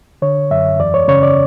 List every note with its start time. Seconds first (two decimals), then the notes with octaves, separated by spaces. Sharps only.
0.22 D3 C#5
0.51 F#2 E5
0.80 E2 D5
0.94 C#5
1.08 C#3 C#5
1.23 D5